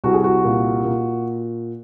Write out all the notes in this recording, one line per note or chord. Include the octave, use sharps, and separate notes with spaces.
C2 F#4
G#4
F#4
A#2
A#2